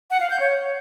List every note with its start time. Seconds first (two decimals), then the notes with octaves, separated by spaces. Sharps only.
0.11 F#5
0.20 F5
0.30 G6
0.40 C#5